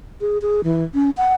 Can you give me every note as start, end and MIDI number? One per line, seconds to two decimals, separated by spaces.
0.21 0.38 68
0.42 0.64 68
0.64 0.84 52
0.94 1.10 61
1.17 1.35 78